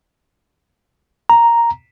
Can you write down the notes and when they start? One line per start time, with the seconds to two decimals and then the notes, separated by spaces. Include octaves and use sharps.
1.30 A#5